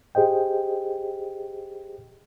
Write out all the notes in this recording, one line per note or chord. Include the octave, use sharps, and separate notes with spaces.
G4 G#4 C5 D#5 G5